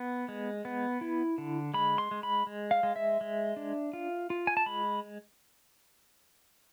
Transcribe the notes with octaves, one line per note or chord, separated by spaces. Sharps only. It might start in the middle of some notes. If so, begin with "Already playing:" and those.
Already playing: B3
G#3
B3
E4
D3
G#3 B5
C6
G#3
B5
G#3
F5
G#3
E5
G#3
D4
F4
F4
G#5
A5
G#3 B5